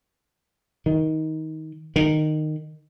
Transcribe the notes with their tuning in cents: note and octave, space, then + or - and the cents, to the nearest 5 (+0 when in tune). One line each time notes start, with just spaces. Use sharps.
D#3 +20
D#3 -15